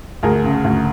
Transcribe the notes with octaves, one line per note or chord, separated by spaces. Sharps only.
D2 G#4 A#4
C#3
D2